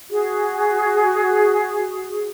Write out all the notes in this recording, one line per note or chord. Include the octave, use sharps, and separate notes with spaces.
F#4 G#4